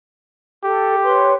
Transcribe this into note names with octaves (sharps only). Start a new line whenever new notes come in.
G4 A4
B4 C#5 C6